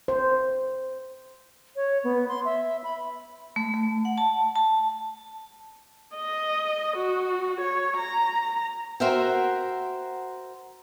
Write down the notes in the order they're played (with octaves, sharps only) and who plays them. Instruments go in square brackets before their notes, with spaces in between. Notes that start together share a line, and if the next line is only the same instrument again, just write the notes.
[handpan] C5
[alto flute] C#5
B3
C6
E5
B5
[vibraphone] A3
A3
F#5
A5
A5
[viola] D#5
F#4
C#5
A#5
[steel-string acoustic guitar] F#4 A#4 C5 E5 F#5 G5